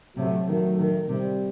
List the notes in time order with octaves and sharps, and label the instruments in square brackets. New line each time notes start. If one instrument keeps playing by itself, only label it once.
[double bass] C3 [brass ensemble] F#3 A3
[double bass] D#3 [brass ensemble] F#3 A3
[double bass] D#3
[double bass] C3 [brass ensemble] G3